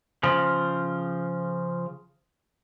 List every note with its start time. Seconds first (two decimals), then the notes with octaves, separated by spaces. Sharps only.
0.23 C#3 F3